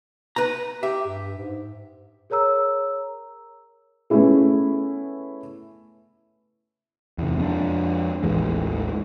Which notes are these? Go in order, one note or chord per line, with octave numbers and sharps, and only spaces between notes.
B4 A#5
G4 E5
G2
G#2
G#4 A#4 C#5 A#5 E6
A3 B3 C#4 E4 G#4
E2 C3
F2 C4 D4
A1 D#2 E3 G#3